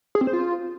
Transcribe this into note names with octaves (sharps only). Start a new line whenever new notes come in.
G#4
C4
C5
F4